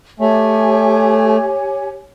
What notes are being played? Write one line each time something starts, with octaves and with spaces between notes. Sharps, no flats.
A3 G4 C#5 G#5